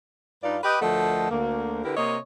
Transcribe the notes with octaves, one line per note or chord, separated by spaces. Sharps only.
G2 D#4 F4 B4 D5
G4 B4 D#5
D2 F3 A3 A#4 D#5 F#5
D2 A#3
D3 E4 G4 A#4 B4
C3 A#3 C#5 D#5